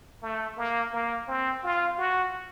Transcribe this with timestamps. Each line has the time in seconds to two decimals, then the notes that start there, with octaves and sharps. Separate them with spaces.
0.22 A3
0.57 A#3
0.93 A#3
1.27 C4
1.64 F4
1.98 F#4